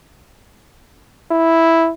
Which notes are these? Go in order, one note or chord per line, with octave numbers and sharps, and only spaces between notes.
E4